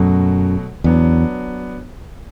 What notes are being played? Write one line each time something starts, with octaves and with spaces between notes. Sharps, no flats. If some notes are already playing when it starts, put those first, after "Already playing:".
Already playing: F#2 B2 F#3 A3
E2 F#3 B3 D4